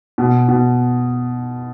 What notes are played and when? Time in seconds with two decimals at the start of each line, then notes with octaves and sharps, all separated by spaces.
0.18 B2
0.48 B2